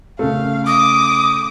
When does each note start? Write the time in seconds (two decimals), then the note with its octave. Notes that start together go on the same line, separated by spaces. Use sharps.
0.19 C#3 A3 F5
0.67 D6 D#6